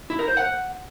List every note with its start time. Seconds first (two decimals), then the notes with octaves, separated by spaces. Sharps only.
0.10 E4
0.19 A#4
0.28 C5
0.37 F#5